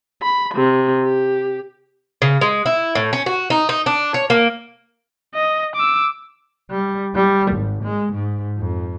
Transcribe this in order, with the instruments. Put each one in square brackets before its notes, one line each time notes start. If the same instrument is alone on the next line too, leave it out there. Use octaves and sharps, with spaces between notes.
[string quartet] B5
C3
G4
[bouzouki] C#3
G#3
E4
A2
C#4
F#4
D#4
D#4
D4
C#5
A#3
[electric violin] D#5
D6 E6
[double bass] G3
G3
G#1
G#3
G#2
F2